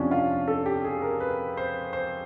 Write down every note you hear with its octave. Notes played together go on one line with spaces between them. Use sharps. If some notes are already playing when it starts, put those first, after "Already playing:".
Already playing: F2 C3 F3 C#4 D4
F4
A4
G4
G#4
A#4
B4
C5
C5